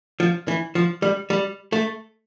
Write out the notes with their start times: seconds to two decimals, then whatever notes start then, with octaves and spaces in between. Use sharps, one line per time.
0.20 F3
0.48 E3
0.75 F3
1.02 G3
1.30 G3
1.72 A3